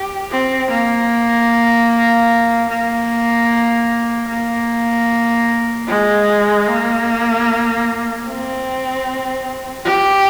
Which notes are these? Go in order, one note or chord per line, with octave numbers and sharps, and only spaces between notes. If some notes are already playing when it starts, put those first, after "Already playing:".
Already playing: G4
C4
A#3
A#3
A#3
G#3
A#3
C4
G4